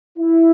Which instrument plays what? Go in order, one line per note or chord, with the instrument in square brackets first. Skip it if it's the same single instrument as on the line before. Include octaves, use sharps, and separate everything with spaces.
[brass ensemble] E4